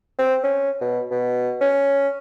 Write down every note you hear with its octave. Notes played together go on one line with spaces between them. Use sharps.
C4
C#4
B2
B2
C#4